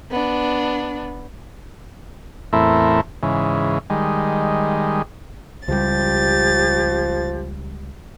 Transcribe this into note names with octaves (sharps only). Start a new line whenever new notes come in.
B3 D4
E2 A2 A3 C4 E4 A#4
G#2 C#3 E3
D#3 G3 G#3
C#2 F3 G3 G4 A6